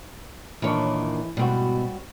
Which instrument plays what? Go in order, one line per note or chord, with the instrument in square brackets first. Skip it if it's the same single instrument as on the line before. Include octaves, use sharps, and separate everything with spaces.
[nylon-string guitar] A#2 D#3 D4 [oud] E3 C#5
[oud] G#2 B2 [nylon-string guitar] G3 C4 F#4